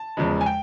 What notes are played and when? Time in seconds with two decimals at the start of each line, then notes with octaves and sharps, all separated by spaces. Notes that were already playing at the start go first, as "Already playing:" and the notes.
Already playing: A5
0.17 E2 C#3 F3 G#3
0.41 G#5
0.46 G5